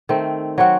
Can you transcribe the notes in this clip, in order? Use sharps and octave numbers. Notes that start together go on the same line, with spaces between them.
D#3 A3 C4
F#3 C4 F#4